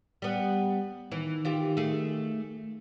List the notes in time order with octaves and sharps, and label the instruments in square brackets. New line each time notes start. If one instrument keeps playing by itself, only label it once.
[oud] G3 B3
[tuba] D#3 [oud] E3
[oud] E3 F4 G4
A3 G#4